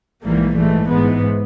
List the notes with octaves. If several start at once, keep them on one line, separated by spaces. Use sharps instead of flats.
A#1 G#2 E3 G3 A#3
G#2 E3 A3
G#2 E3 G#3 B3